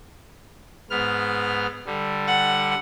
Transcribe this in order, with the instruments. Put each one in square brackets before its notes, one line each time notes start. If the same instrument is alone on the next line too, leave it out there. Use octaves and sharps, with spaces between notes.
[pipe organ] G#2 B3 F6
D3 G3
[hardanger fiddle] F#5